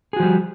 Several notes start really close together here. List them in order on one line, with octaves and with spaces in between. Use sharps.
G#4 F#4 F3 G3